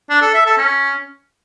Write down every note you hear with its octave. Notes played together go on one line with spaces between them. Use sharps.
D4
A4
E5
A4
C#4